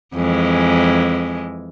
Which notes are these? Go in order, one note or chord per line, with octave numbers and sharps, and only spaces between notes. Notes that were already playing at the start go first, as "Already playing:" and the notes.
F2 E3 G#3